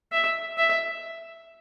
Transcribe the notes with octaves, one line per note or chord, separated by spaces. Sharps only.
E5
E5